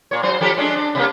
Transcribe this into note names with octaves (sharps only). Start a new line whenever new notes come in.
A#2 C#5
G#2 F#3 C5
F3 G4 A4
G#3 C#4 D4
D4
C3 G3 A#3